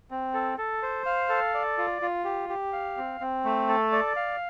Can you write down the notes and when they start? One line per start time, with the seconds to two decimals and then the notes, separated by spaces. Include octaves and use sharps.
0.11 C4
0.34 A4
0.58 A4
0.83 C5
1.06 F5
1.29 A4
1.54 D5
1.78 F4
2.02 F4
2.25 G4
2.49 G4
2.73 F5
2.97 C4
3.21 C4
3.45 A3
3.69 A4
3.92 D5
4.16 F5